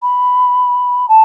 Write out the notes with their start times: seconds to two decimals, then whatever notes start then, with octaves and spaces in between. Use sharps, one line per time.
0.02 B5
1.09 A5